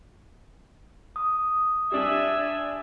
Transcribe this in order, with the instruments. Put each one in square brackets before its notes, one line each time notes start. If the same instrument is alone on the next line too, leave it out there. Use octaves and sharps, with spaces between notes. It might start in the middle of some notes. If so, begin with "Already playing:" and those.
[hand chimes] D#6
[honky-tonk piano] G3 D4 [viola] E5 G#5